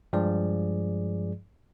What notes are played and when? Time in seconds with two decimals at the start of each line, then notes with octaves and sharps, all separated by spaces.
0.13 G2 F3 G#3 G#4 D5